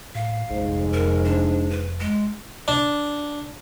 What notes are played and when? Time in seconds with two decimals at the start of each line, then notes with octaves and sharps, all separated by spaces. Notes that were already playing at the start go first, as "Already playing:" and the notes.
0.15 A2 F5
0.50 F1 A#1 G#2
0.93 F2 A#4
1.25 D4
1.70 B4
2.00 G#3
2.68 D4